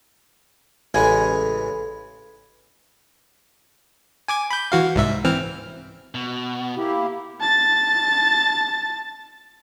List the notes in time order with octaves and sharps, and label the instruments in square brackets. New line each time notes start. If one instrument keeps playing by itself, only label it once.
[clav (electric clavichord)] A1 [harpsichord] C#3 E3 G#3 [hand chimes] A4 F5 B5 [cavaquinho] G#5
[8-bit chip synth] G#5 D6 G#6
B5 G6
E3 F#4 F5
C2 G#2 E5
E3 C4 F6
[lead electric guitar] B2
[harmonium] A#3 E4 G4
[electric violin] A5 A6